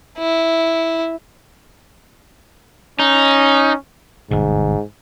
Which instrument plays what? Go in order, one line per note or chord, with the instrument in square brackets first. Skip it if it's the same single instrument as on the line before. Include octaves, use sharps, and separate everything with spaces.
[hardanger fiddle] E4
[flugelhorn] C#4 [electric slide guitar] D#4
[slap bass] G1 B2 [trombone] G#2